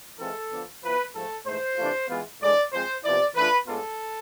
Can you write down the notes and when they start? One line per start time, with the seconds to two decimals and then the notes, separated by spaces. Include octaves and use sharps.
0.19 E3 G#3 C4 F4 A4
0.52 D3 F3 B3 D4
0.83 F3 B3 E4 B4
1.14 G#2 F3 A3 A4
1.46 G#2 E3 A3 C5
1.77 C3 E3 A3 D4 F4
2.09 E3 G#3 B3 F4
2.41 A2 E3 G#3 D4 D5
2.73 F3 G#3 C4 C5
3.04 C3 F3 B3 E4 D5
3.35 E3 A3 D4 F4 B4
3.67 A2 G#3 B3 D4 F4 A4